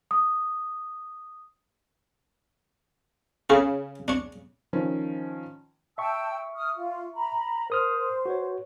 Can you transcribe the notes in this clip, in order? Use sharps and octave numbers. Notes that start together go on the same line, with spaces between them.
D#6
C#3 G#4 A4
D4 C#5
D#3 F3 C#4
E5 G5 A5 C#6 E6
D#6 F6
F4
A#5 B5
A#4 C5 D#6 F6
F#4 B4 C#5